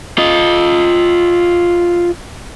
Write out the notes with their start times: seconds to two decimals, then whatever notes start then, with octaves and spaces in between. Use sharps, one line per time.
0.18 F4 D#5